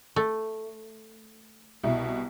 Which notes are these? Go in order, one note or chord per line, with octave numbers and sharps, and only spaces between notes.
A3
C2 B2 E4